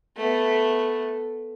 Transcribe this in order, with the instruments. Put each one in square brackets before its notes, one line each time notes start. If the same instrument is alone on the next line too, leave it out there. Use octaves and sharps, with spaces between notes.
[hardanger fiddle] A3 B3